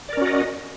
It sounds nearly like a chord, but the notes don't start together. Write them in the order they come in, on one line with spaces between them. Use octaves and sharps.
D5 A#4 C#4 F#4 D#5